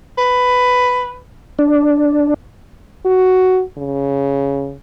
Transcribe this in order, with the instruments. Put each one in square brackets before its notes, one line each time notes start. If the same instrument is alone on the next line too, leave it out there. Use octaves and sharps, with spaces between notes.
[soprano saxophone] B4
[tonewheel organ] D4
[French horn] F#4
C#3